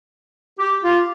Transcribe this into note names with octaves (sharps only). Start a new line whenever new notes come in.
G4
F4